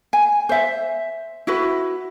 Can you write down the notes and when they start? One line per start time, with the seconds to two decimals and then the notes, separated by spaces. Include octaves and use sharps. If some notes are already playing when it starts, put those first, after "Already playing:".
0.13 G#5
0.49 C5 E5
1.47 E4 F#4 B4